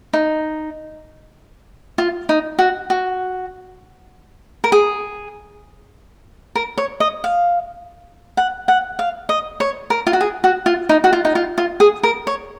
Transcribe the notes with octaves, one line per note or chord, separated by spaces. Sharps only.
D#4
F4
D#4
F#4
F#4
A#4
G#4
A#4
C#5
D#5
F5
F#5
F#5
F5
D#5
C#5
A#4
F4
F#4
G#4
F#4
F4
D#4
F#4
F4
D#4
F4
F4
G#4
A#4
C#5